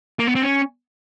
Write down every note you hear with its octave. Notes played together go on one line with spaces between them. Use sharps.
A#3
B3
C4
C#4